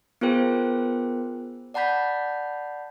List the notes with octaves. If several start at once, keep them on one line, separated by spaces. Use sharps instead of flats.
B3 F4 G#4 A#4 C5 G5
D5 F#5 A5 B5 G6 B6